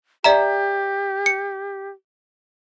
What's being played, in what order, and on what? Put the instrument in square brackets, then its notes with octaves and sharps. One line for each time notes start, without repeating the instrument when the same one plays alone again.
[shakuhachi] G4 [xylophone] D5 E5 A#5
[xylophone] C#7